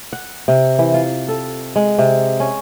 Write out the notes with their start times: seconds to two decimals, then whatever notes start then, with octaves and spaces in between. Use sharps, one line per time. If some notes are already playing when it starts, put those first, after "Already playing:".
0.13 F#5
0.48 C3
0.79 E3
0.94 F4
1.28 A4
1.76 G#3
1.99 C3
2.40 C#4